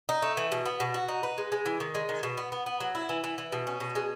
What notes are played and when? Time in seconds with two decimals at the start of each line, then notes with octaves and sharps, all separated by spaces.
0.09 D#4
0.22 A3
0.37 E3
0.52 B2
0.65 B3
0.80 B2
0.94 F#4
1.08 D#4
1.23 B4
1.38 G#3
1.52 G#3
1.66 E3
1.80 D#3
1.95 G#3
2.09 D#3
2.23 B2
2.37 B3
2.52 B3
2.66 B3
2.80 F#3
2.95 E4
3.09 E3
3.24 E3
3.38 E3
3.52 B2
3.67 C#4
3.80 B2
3.95 G#3